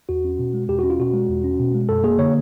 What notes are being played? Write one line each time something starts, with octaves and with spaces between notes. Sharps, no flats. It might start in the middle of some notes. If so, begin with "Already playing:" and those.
E2 F#4
C#4
B2
G#3
E2 G4
C#4 F#4
F4
B2 F#4
G#3
E2
C#4
B2
G#3
F#2 A4
A#3 G#4
D3 C#5